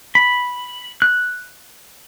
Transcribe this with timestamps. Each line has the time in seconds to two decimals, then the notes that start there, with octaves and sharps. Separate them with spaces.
0.15 B5
1.02 F#6